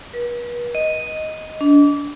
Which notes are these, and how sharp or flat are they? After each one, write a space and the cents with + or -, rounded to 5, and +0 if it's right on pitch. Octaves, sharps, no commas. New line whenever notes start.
B4 -40
D#5 +0
D4 -30